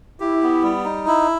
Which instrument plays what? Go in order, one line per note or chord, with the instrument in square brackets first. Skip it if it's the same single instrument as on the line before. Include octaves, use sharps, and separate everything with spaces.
[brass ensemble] E4 [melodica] G4
[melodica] B3
G3
D#4
E4